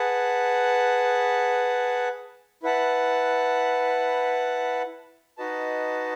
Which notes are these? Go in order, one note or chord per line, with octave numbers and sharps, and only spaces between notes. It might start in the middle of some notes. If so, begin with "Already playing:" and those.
Already playing: G#4 B4 F#5 A5
E4 B4 F#5 A5
D#4 F#4 B4 D#5 A5